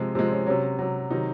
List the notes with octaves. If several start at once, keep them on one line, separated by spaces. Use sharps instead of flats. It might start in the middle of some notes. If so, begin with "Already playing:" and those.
Already playing: C3 F3 G#3 C4
C3 F3 G#3 C4
C#4
C3 F#3 C#4
C3 F#3
C3 D#3 F#3 D#4